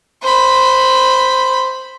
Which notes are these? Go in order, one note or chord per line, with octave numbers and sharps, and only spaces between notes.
C5 B5